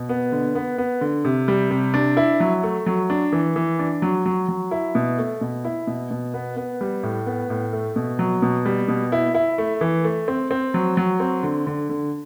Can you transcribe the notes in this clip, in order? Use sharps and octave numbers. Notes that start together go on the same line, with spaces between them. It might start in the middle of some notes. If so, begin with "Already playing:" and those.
Already playing: B2
B3
D3
B3
B3
D3
C3
G3
C3
D4
E4
F#3
A3
F#3
D4
E3
E3
D4
F#3
F#3
F#3
E4
B2
A3
B2
E4
B2
B2
B3
B3
G3
A2
B3
A2
A3
B2
F#3
B2
G3
B2
E4
E4
A3
E3
A3
C4
C4
F#3
F#3
C4
D3
D3
D3